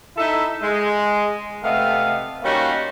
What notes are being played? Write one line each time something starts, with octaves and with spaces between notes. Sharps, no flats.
D#4 E4 A4 E5
G#3
C3 A3 B3 D#5 F5
G3 A#3 C#4 D#4 F4 F#4